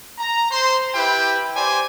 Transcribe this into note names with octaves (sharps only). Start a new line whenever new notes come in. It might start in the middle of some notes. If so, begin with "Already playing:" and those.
A#5
C5 C6
E4 G4 B4 G5
G4 C5 D5 G#5